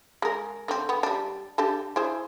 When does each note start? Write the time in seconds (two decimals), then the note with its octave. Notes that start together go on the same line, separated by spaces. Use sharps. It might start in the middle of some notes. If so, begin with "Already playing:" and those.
0.22 G#3 A#4
0.68 D3 C4
0.89 B3
1.03 G3 D4
1.58 D4 G4 A4
1.96 E4 G#4 C5